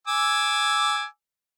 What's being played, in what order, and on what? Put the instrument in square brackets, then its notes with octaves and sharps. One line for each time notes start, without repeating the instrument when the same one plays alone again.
[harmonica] G#5 D6 E6